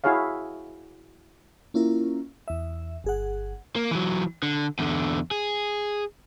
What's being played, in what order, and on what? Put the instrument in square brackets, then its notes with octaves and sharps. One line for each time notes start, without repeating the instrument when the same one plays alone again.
[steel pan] E4 F#4 G#4 C#5 F5
[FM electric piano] A#3 C#4 E4 F4 A#4
E2 E5
G1 G#4 F#5
[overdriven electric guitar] A#3
E3 F#3
D3
E2 D3
G#4